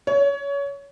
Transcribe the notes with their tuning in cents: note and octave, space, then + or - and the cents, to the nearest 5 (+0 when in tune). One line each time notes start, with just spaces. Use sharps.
C#5 +25